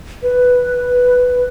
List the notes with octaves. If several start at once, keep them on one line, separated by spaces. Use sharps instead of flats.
B4